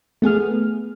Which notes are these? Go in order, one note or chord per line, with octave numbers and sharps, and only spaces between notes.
A3 B3 G#4 F6